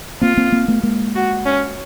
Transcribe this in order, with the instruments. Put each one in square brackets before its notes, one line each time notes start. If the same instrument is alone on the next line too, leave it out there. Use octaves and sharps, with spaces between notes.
[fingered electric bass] A#3 C4 [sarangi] F4
[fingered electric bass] A#3 C4
A#3 C4
A3 B3
G#3 A#3
[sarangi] F#4
C#4